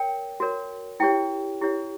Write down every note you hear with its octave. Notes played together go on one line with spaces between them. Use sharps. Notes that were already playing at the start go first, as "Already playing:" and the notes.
Already playing: A#4 C#5 G5
F#4 A#4 C#5
E4 G4 C#5 G5
E4 G4 C#5